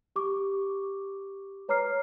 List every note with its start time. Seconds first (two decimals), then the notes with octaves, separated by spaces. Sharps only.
0.16 G4 C#6 D6
1.68 B4 C#5 A#5 D6 F6 C7